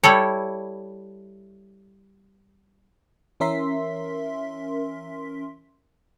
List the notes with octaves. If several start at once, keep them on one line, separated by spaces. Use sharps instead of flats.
G3 E4 A4 C#5
E3 C#4 A#4 E5 C6 B6